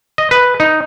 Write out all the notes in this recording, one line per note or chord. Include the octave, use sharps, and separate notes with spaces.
D#5
B4
D#4